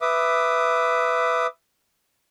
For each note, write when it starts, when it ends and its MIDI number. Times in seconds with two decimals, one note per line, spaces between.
0.01 1.47 71
0.01 1.47 76
0.01 1.47 86
0.01 1.47 87